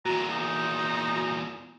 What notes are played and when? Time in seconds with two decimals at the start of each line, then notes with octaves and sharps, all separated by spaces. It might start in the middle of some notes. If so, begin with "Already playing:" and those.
0.06 E2 A#2 F#4 A#5
0.29 D#4